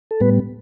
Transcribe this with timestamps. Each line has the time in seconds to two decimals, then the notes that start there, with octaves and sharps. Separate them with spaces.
0.11 A4
0.20 A2 G3 B3 B4